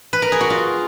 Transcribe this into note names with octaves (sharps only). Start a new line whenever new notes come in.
B4
A#4
G#4
F#4
F4